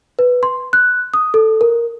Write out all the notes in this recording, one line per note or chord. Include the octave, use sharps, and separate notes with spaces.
B4
C6
F#6
D#6
A4
A#4